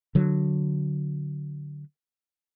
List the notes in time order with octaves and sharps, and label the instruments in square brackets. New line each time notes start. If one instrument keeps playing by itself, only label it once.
[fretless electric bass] D3 F#3